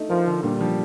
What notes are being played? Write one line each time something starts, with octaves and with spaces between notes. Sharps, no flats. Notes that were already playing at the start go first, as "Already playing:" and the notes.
Already playing: A3 D#4
F3 A#4
D3
A#2 G3
F3